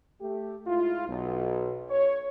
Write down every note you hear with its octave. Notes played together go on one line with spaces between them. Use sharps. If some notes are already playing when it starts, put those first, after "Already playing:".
A3 G4
G#2 E4 F4
B1
C#5